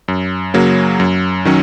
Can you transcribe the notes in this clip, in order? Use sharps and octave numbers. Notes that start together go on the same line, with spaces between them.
F#2
C#3 F#3 A#3
F#2
D#3 F#3 C#4